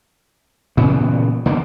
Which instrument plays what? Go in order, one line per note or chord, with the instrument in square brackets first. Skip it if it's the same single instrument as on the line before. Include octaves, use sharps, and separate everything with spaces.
[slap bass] A#2 C#3 E3 B3
D3 D#3 A#3 B3